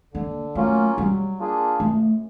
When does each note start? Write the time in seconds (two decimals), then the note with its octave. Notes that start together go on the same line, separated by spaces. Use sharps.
0.14 D3 A#3
0.55 F#3 A3 A#3 C#4 F4
0.97 F#3 G3
1.39 A#3 D4 F4 G#4
1.80 F#2 A3